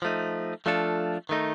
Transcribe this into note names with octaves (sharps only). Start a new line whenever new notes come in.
F3 A3 D#4
F3 A3 D4 F4 A4
D#3 A3 D#4